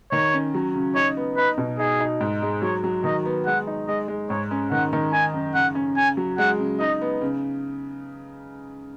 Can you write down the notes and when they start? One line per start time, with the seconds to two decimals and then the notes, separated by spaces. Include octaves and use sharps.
0.12 D#3 C#5
0.33 C#4
0.54 F#3
0.74 C#3
0.95 D#4 C#5
1.17 B3
1.37 D#4 B4
1.58 B2
1.79 D#4 G#4
2.00 D#4
2.20 G#2
2.42 G#3
2.62 F#3 C#5
2.84 F#3
3.04 D#3 D#5
3.25 B3
3.46 G#3 F#5
3.67 D#4
3.87 G#3 D#5
4.08 G#3
4.30 G#2 C#5
4.51 C#4
4.71 D#3 F#5
4.93 D#3
5.13 D#4 G#5
5.34 F#2
5.55 C#3 F#5
5.75 C#4
5.96 C#3 G#5
6.17 F#3
6.38 G#3 F#5
6.58 C#3
6.80 D#4 D#5
7.01 B3
7.21 C#3